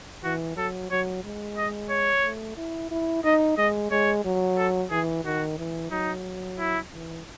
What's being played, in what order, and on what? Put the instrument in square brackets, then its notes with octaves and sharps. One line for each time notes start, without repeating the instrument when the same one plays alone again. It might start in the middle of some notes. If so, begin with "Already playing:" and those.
[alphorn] E3 [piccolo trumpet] F#4
[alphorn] F#3 [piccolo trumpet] A4
[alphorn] F#3 [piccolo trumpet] C#5
[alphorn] G#3
[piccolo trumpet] D#5
C#5
[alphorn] A3
E4
E4
[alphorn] D#4 [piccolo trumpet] D#5
[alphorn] G#3 [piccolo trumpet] D#5
[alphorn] G#3 [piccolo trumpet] C#5
[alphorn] F#3
[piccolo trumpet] A4
[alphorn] E3 [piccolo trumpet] G#4
[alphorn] D#3 [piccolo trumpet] F#4
[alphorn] E3
[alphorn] F#3 [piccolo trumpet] D#4
[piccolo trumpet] E4
[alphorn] E3